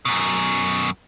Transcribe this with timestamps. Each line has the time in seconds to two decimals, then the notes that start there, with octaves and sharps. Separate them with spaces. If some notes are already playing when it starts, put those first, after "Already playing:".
0.05 F#2 B2